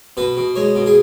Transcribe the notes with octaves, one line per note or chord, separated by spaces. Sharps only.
B2 B4
B2
G#3 C#5
B2
G#4